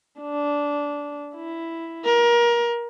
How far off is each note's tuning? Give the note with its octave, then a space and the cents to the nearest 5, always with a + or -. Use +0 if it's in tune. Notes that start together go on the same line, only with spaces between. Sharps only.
D4 -15
E4 +5
A#4 +25